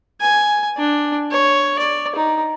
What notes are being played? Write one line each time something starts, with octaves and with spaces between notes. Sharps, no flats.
G#5
D4
C#5
D5
D#4